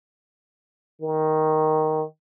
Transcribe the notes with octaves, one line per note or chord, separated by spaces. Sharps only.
D#3